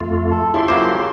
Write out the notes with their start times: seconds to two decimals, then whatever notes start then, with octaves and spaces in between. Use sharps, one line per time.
0.01 F2 A3 F4
0.31 A4
0.54 C#3 E4 F4 G4 C6
0.68 F#3 A#3 C5 D6